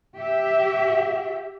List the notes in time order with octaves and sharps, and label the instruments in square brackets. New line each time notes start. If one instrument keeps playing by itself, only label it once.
[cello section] G4 E5